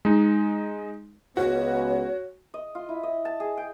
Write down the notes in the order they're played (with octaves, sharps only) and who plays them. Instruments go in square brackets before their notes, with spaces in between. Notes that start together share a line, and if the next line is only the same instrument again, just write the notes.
[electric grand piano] G#3 D#4
[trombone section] C#2 B3 [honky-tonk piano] F#4 [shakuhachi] C#5
[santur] D#5
F4
E4
D#5
A5
G#4
G5